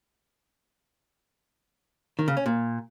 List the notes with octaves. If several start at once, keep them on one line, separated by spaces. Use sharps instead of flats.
D#3
C#3
C#4
A#2